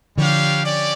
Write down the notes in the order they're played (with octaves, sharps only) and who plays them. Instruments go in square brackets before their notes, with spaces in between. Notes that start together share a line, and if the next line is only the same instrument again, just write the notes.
[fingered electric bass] D3 F3 [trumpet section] G3 D4 G4 C#5 F5
[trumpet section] C#4 G4 D5